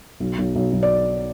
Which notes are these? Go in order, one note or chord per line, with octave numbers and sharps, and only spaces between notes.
B1
B1
B1
B1
D5